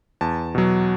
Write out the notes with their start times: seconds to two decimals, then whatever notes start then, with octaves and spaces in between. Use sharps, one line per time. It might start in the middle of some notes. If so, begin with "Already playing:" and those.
0.21 E2 A5
0.55 B2 F#3